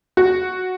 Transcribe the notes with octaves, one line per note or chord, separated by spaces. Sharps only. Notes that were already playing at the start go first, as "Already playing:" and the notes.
F#4